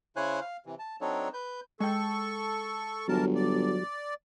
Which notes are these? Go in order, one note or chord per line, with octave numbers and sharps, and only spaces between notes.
C#3 E4 C5 C#5 G#5 F#6
F5
C3 E3
A5
F#3 C4 D4 D#4 A4 C#5
B4 G6
G#3 A4 G5 C#6
G1 E3 F#3 A#4 A5
D5